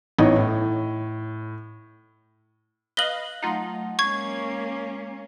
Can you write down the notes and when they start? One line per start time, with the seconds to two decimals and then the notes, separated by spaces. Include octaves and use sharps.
0.19 A1 B3 D#4 C#5 D#5
0.36 A2
2.97 B4 D#5 F5 F#7 G7
3.42 F#3 A3 D#4 F4 F#5
3.99 G#3 A#3 C#4 C#6 G#6